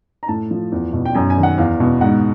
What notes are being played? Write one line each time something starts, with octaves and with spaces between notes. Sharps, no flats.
A#5
A2 A5
F3
E2
B2
G5
F#2 G#5
G#5
D#3
F#5
E2 F5
B2
G#2 F#5